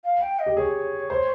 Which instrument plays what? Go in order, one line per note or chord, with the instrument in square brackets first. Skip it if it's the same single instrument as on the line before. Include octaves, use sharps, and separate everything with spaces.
[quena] F5
G5
D#5
[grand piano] G4
[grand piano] G#4 [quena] C#5
[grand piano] C5